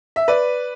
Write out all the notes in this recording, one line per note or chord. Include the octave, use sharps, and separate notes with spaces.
E5
B4 D5